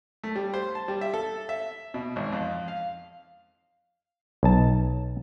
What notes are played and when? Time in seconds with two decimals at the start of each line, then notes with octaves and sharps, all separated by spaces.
0.24 A3
0.35 G3
0.54 C5
0.75 A5
0.88 G3
1.01 E5
1.14 A4
1.49 E5
1.94 B2
2.16 G#1
2.32 F2
2.68 F5
4.43 B1 A5